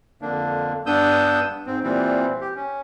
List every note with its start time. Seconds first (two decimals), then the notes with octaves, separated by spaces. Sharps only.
0.22 F2 D3 A#3 D4
0.86 G2 B3 D4 D#6 E6 G6
1.66 G#2 C4
1.83 A#2 E3 G3 C4
2.41 G4
2.56 C#4